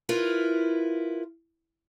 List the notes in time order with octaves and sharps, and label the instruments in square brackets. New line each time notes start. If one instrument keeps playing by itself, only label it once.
[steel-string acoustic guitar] E4 F4 A#4 B4